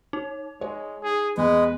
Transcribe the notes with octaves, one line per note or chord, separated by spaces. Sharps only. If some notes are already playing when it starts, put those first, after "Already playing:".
D#4
G#3 C#5
G#4
E2 G#3 B4